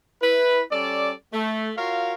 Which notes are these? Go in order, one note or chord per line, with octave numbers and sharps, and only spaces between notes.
E4 B4
G3 C#4 A4 D5
A3
F4 F#4 A#4 C#5 F5